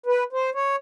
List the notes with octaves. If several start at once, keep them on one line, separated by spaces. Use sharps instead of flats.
B4
C5
C#5